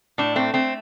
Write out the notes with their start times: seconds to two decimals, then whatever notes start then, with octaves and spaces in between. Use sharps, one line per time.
0.18 A2 D4
0.36 A3 C4
0.54 A3 C4